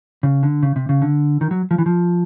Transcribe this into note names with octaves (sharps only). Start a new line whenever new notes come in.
C#3
D3
C#3
C3
C#3
D3
D#3
F#3
F3
E3
F3